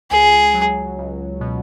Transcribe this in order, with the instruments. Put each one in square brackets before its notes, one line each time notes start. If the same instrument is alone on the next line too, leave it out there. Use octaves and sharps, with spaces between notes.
[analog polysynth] C#2 [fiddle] G#4
[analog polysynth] F#3
C#2
B2